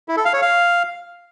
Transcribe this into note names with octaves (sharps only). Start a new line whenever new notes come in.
E4
A4
F5
C#5
F5